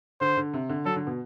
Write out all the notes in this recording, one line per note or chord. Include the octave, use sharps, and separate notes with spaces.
D3 C5
D3
C3
D3
F#3 A4
D3
B2